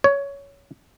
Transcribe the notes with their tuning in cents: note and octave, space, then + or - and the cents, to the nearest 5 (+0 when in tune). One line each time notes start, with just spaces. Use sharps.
C#5 +15